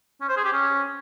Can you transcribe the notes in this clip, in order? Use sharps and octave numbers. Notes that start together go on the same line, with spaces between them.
C#4
C5
G#4
G4
C#4